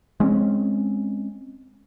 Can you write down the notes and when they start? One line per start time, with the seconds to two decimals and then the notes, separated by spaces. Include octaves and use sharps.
0.20 G#3 C4 C#4